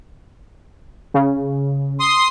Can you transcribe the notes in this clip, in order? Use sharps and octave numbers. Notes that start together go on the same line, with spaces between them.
C#3
C6 D#6